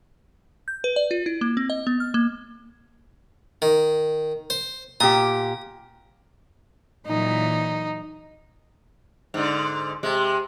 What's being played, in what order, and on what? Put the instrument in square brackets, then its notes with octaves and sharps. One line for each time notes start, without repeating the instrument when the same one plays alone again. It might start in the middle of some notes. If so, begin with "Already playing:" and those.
[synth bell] G6
B4
D5
F4
E4
A#3
C4
D#5
B3
F6
A#3
[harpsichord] D#3
C5
[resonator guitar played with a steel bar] A#2 G4 [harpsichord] D#6
[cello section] A#2 E3 F#3 [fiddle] D#4
[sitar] G#2 D3
C3 G#3